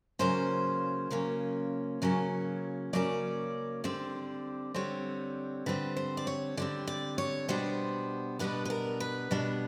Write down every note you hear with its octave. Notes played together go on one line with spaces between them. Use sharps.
C#3 F#3 A#3 C#4 C5
C#3 F#3 A#3 C#4
C#3 F#3 A#3 C#4
C#3 F#3 A#3 C#4 D5
D3 G3 C4 D5
D3 G3 C4 C#5
D3 G3 C4 B4
C5
D5
C#5
D3 G3 C4 D5
D5
C#5
B2 G3 B3 D4 C5
B2 G3 B3 D4 B4
B4
A#4
B4
B2 G3 B3 D4